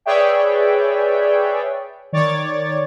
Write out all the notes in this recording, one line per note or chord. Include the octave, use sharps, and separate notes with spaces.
G#4 B4 C#5 D5 E5 G5
D#3 C#5 D5 D6 A6